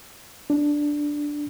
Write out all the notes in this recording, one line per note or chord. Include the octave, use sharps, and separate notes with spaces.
D4